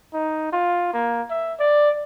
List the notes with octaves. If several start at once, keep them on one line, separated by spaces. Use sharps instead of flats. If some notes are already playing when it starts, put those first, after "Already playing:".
D#4
F4
A#3
E5
D5